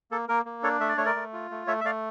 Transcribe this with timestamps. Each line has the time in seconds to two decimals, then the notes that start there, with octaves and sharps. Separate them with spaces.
0.11 A#3 A4
0.29 A#3 A#4
0.45 A#3
0.63 D4 A4 C#5
0.80 A3 E5
0.88 D5
0.97 A3 C#5
1.05 A#4 D5
1.15 A3
1.33 F4
1.51 A3
1.67 A3 C#5 E5
1.81 E5
1.84 A3 D5 F5